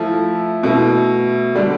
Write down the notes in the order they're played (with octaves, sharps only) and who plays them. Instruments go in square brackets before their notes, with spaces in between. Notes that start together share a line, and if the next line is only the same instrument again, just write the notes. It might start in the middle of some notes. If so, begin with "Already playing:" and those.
Already playing: [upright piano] F3 A3 E4
B2 A3 E4
D3 G3 D4